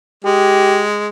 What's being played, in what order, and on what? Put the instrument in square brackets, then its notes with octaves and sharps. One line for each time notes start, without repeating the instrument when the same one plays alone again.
[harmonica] G#3 [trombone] G4